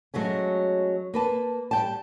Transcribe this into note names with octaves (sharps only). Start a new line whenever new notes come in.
F#3 G#3 A3 C#4
A#3 B4 A5
G3 G5 A5